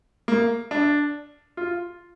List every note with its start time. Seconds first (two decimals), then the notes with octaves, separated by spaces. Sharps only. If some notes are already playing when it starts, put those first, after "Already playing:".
0.28 A#3
0.71 D4
1.57 F4